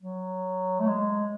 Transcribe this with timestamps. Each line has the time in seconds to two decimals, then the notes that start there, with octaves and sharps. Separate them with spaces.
0.02 F#3
0.80 A3
0.87 G#3